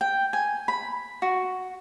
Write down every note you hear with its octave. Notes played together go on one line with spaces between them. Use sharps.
G5
G#5
B5
F#4